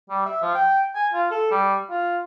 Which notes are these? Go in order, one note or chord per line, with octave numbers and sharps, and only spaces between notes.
G3
E5
F3
G5
G#5
F4
A4
G3
F4